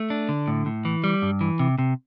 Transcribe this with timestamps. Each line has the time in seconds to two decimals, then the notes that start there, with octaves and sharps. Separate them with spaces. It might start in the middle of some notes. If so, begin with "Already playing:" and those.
Already playing: A3
0.10 D4
0.29 D3
0.48 A2
0.66 A2
0.85 E3
1.04 G3
1.22 G2
1.41 E3
1.60 C3
1.79 C3